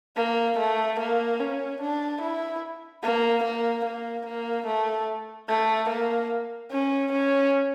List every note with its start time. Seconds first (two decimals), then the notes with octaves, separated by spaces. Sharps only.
0.16 A#3
0.58 A3
0.99 A#3
1.40 C#4
1.81 D4
2.21 E4
3.03 A#3
3.44 A#3
3.85 A#3
4.26 A#3
4.67 A3
5.49 A3
5.89 A#3
6.71 C#4
7.12 C#4